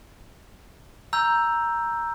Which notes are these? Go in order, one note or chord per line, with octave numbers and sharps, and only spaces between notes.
A#5 E6 G6